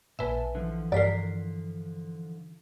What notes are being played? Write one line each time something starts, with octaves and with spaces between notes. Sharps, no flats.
A#1 A#2 B4 E5 G#5 A5
D3 E3 F3
G2 A#4 D5 B6 C7